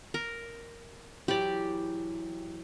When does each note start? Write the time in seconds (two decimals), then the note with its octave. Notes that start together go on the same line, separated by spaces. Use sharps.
0.14 A#4
1.28 E3 F#3 E4 G4 D5